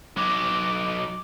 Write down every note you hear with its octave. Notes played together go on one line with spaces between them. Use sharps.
F#3 D#4 D6